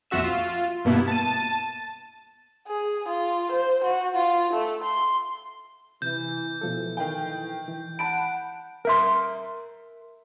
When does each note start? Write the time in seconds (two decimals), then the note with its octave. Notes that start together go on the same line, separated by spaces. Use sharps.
0.10 A#1 F2 F4 F#4 E5 E7
0.24 F4
0.85 G2 B2 A#3 B3 E4
1.08 A5 A6 D#7
2.68 G#4
3.08 F4
3.51 C5
3.84 F#4
4.16 F4
4.53 A3
4.83 C6
6.02 C3 E3 G6
6.61 B2 E3 F3 A4
6.97 D#3 G5
7.68 E3
7.99 F#5 A5 B5 D7
8.85 A#4 E5 C6